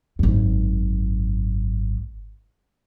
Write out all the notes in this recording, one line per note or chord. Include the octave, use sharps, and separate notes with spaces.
G#1 F#2